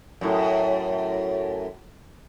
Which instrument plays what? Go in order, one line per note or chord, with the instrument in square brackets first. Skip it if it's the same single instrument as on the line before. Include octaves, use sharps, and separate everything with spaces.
[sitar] F#2 A2